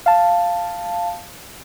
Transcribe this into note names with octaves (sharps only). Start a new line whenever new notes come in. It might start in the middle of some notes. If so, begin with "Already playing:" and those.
F5 A5